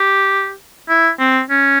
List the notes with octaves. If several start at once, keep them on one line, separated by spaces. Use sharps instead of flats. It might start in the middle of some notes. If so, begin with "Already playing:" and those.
Already playing: G4
E4
C4
C#4